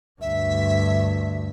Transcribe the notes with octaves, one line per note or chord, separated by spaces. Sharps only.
D2 G2 E5